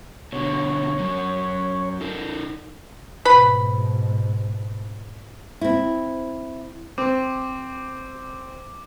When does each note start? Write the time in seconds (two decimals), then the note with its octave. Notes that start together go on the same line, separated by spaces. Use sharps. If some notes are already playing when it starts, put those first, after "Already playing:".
0.33 B2 D3 C#5
0.99 F#2 F#3
2.01 D#4 A4 A#4
3.25 G#2 B2 B4 B5
5.61 C4 E4
6.98 C4 D6